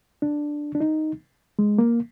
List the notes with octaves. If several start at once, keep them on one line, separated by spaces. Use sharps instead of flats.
D4
D4
D#4
G#3
A#3